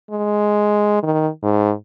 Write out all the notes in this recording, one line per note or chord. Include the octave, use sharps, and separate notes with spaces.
G#3
D#3
G#2